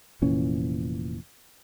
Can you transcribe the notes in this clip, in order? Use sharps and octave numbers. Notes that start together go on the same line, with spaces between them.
F1 A#2 E3 C#4